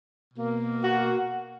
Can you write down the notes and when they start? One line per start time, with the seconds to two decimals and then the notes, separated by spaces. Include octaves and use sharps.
0.34 B2 A#3
0.84 F#4